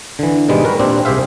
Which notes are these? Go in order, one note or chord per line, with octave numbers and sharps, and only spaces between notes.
D3 E3
G#2 B2 D#3 G3 G#3
F#4 A#4 B4
A#2 C4 D4 G4
C2 G4 G#4 C5 E5 F5